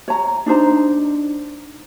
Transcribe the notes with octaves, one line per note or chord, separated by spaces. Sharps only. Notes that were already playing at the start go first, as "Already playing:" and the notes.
C#5 A#5
D4 D#4 C5 A#5